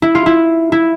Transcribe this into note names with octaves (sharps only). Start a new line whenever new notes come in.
E4
F4
E4
E4